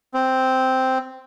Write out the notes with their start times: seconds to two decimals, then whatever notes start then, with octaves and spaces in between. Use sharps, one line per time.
0.14 C4